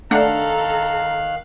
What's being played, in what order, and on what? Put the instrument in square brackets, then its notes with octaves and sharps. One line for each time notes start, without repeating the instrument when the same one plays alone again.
[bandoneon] D#3 F5 F#6 [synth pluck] A3 D4 F#5 [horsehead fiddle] A4 A#5